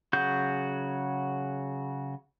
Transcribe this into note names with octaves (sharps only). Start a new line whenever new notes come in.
C#3 F#3 F#4 G#4 G6